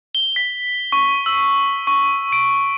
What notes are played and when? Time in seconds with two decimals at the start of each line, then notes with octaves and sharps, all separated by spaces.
0.15 G7
0.36 B6
0.92 C#6
1.26 E6
1.87 C#6
2.32 D7